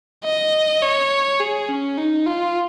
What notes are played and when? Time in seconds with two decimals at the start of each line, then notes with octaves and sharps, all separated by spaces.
0.24 D#5
0.82 C#5
1.40 G#4
1.69 C#4
1.98 D#4
2.26 F4